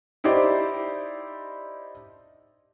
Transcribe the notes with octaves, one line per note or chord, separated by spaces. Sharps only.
D#4 E4 G4 C5 D5